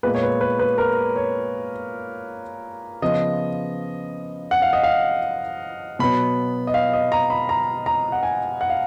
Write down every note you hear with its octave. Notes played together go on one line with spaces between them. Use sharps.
A#2 G#3 B3 B4
C#5
B4
B4
B4
A#4
C#5
C#3 F3 B3 D#5
F#5
F5
D#5
F5
B2 F#3 B3 B5
D#5
F5
D#5
A#5
B5
A#5
A#5
F#5
G#5
F#5
F5